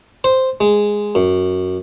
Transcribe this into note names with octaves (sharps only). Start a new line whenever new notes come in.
C5
G#3
F#2